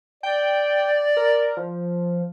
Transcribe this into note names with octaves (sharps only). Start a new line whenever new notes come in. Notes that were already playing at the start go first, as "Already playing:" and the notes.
D5 G5
A#4
F3